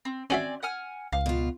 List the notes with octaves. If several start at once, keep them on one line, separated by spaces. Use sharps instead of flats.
C4
C4 C#4 F#4 D5 E5 G#5
F#5 G#5 F6
C#2 F5
B2 F4